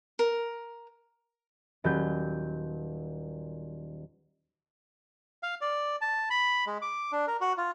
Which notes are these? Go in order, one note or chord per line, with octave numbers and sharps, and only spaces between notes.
A#4
D#1 F#3 B5 G6
F5
D5
A5
B5
G#3
D6
D4
A#4
F#4
F4